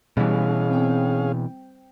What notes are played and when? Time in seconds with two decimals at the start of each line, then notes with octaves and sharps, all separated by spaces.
0.17 B2 E3 G3 C#4 G#4 F5
0.71 C4 G5